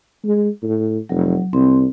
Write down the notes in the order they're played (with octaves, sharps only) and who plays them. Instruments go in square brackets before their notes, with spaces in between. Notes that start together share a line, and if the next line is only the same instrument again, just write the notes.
[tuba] G#3
A2
[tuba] F1 [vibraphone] F#3
[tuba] C2 [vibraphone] C4